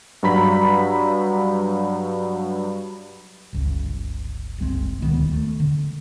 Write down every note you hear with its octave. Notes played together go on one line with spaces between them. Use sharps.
G2 F#3 A#5 B5 B6
G1 C#2 C#3
F#1 C2 G#3 C4
D#1 D2 D#3 B3
A3
D3